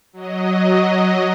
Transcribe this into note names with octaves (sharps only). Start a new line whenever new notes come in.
F#3 D#5